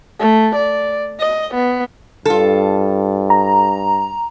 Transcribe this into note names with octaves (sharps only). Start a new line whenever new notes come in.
A3
D5
D#5
B3
G2 F4 A4
A#5